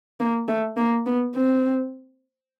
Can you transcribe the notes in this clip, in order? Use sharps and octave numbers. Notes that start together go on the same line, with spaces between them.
A#3
A3
A#3
B3
C4